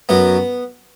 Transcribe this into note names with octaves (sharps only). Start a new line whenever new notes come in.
F#2 F#3 B3